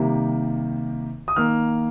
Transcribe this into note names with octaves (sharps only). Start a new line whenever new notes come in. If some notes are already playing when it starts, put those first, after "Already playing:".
Already playing: C3 D#3 G3 A#3
D#6
D#3 A#3 F6